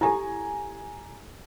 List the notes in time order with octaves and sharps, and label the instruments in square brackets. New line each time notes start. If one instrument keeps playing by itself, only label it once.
[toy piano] E4 G4 A4 [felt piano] G#5 A#5